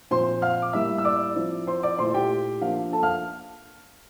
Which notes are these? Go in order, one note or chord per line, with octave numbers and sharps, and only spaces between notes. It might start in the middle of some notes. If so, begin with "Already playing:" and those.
A#2 F3 C4 C5 C6
F5 F6
D6
A2 G3 A#3 E5 E6
E6
D5 D6
F3 C4 E4
C5 C6
D5 D6
A#2 A3 E4 C5 C6
G4 G5
F3 A#3 D4 F5
A4 A5
F5 F6